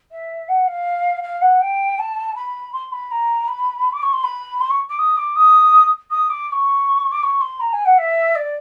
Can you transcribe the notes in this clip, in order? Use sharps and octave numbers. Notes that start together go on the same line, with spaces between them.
E5
F#5
F5
F5
F#5
G5
A5
B5
C6
B5
A#5
B5
D6
C#6
C6
B5
C6
C#6
D6
D#6
D6
D#6
D#6
D6
D6
C#6
D6
C#6
C6
A#5
G#5
F#5
E5
D5